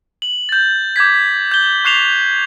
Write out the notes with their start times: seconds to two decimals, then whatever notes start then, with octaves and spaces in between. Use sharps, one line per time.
0.22 F#7
0.49 G6 A6
0.96 D6 G6 G#6 B6
1.51 G6 G7
1.85 C#6 F#6 C7 E7 F7 G7